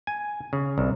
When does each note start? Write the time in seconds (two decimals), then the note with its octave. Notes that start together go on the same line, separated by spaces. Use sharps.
0.07 G#5
0.53 C#3
0.78 C2